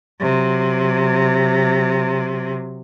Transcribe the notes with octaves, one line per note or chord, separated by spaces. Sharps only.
C3 F#3